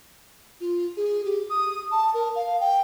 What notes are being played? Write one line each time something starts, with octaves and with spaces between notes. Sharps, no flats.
F4
G#4
G4
D#6
A5
A#4
F5
G5